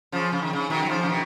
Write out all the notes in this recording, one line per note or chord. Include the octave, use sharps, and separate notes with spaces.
C#3 F3
C#3
D#3
C#3
B2 D#3
F#3
C#3 F3
C#3
B2 D#3